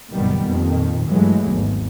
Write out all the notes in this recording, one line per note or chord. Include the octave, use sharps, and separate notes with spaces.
F#1 A#2 D#3 G3 B3
F2 A#2 D#3
G2 E3 F#3 G#3 A3
G#1 E2